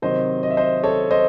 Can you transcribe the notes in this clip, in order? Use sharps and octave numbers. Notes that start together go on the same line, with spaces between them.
C3 D#3 F#3 C5 D#5
D#5
E5
C5 D#5
A4 C#5
C5 D#5